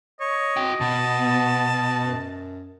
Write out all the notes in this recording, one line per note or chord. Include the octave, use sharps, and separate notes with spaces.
C#5 D#5
C4 F#4 G5
B2 B3 A5
F#2